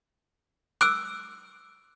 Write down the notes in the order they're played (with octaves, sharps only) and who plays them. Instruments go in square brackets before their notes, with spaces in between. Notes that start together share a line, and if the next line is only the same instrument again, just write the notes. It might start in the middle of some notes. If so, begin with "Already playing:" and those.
[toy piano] D6 E6 [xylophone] F#6 D7